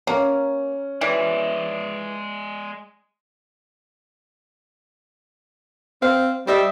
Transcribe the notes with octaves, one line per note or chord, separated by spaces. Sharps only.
A#3 C#4
E3 G#3 D5
C4 F5
G3 C5 D#5 E5